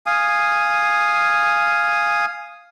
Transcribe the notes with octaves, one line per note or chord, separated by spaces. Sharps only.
F5 G#5 D#6